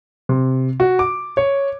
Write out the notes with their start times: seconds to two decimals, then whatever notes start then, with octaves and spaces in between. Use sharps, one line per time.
0.29 C3
0.80 F#4
0.99 D6
1.37 C#5